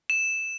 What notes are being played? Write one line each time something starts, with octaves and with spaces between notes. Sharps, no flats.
E7